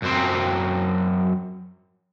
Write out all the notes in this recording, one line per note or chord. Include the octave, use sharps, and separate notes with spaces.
F#2 C4